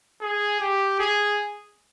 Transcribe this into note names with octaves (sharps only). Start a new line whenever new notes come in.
G#4
G4
G#4